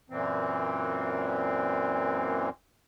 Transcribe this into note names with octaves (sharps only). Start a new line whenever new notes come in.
F#2 A#2 E3 C4